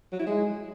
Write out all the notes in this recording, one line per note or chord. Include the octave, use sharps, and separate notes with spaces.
F#3
E4
G#3